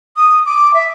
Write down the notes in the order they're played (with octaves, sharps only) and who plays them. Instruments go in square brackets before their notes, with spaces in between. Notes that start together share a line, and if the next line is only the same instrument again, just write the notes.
[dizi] D#6
D6
E5